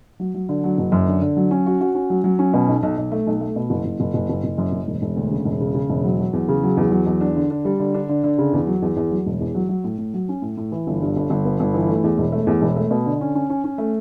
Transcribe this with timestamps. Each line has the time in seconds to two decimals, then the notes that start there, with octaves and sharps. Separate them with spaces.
0.20 F#3
0.34 F#3
0.49 D3
0.64 F#3
0.78 F#1
0.92 F#2
1.07 D3
1.22 D3
1.37 F#3
1.51 C#4
1.66 F#4
1.81 F#4
1.95 C#4
2.10 F#3
2.24 F#3
2.39 C#4
2.54 B2
2.68 B1
2.83 B1
2.97 B1
3.12 A3
3.27 B1
3.41 A3
3.56 B2
3.70 F#1
3.85 F#1
4.00 F#1
4.14 F#1
4.29 F#1
4.44 F#1
4.58 F#2
4.72 F#1
4.88 E1
5.02 E1
5.16 D2
5.31 C#3
5.45 E1
5.61 C#3
5.74 C#3
5.89 E1
6.04 F#3
6.19 F#3
6.33 E2
6.48 C#3
6.63 F#3
6.77 E2
6.91 F#3
7.06 E2
7.21 D4
7.36 D3
7.50 D4
7.65 G3
7.80 D3
7.94 D4
8.09 D3
8.24 D3
8.38 C#3
8.53 E2
8.67 F#3
8.82 E2
8.96 E2
9.11 F#3
9.26 E1
9.40 E2
9.55 F#3
9.69 F#3
9.84 A2
9.98 A2
10.14 F#3
10.29 C#4
10.42 A2
10.57 A2
10.72 E3
10.87 G1
11.01 G2
11.16 G1
11.30 G1
11.45 B3
11.60 G1
11.74 E3
11.89 A3
12.04 E2
12.18 E1
12.32 A3
12.47 E2
12.61 E1
12.76 A3
12.91 B2
13.06 D3
13.21 C#4
13.35 C#4
13.50 C#4
13.64 C#4
13.78 A3